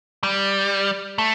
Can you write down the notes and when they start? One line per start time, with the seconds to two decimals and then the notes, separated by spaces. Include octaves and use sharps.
0.23 G3
1.18 A3